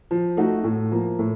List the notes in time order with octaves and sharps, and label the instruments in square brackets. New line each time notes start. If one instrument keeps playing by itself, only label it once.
[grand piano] F3
A3 D#4 F#4
A2
F3 A#3
A2